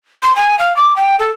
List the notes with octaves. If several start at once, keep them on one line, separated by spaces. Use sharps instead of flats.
C6
G#5
F5
D6
G5
A4